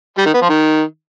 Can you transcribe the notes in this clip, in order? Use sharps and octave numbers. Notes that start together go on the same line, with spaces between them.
G3
D#3
B3
F3
D#3